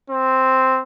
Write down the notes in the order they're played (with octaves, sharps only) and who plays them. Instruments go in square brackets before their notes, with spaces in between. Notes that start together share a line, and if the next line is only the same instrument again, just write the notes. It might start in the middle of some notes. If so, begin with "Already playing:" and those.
[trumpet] C4